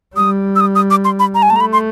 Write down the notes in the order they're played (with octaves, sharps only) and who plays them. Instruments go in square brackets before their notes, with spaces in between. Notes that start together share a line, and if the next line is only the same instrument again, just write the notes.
[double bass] G3 [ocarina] D#6
[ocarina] E6
D#6
D#6
D6
C6
B5
A#5
G#5
[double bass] A3 [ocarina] A5
[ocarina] A#5
B5
C6